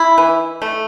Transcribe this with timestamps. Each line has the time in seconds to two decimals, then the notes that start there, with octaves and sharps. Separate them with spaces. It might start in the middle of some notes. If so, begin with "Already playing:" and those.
Already playing: E4
0.18 E3
0.62 A3